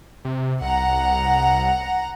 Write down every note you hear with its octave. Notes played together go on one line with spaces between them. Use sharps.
C3
C2 F#5 A#5